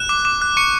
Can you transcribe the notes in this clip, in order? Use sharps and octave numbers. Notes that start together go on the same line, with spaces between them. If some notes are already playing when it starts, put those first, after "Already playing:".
Already playing: F#6 E7
D6
D6
F#6
C#6 C#7